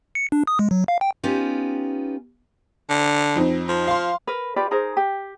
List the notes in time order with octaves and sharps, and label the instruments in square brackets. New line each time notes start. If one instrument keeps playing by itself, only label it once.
[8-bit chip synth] C#7
D4
D#6
G#3
F#3
F5
G5
[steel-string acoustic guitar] B3 C#4 D#4 F4 G4
[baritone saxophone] D3
[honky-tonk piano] F2 C4 D#4
[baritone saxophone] F3
[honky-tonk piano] F5 C6
[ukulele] A#4 B4
F4 G4 B4 D5
D#4 G#4 A#4 C5
G4